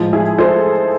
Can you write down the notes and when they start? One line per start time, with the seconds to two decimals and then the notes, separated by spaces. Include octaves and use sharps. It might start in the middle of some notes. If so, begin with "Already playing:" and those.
Already playing: A2 F3 G#3
0.13 E4 G#4
0.38 A4 C5